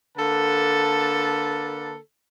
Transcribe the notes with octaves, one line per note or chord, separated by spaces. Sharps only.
D3 A#3 A4 B4 A5